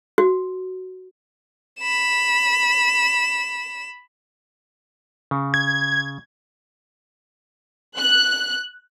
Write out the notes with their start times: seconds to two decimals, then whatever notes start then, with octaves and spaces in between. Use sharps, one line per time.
0.18 F#4
1.80 B5 E7
5.31 C#3
5.54 G#6
7.98 F#6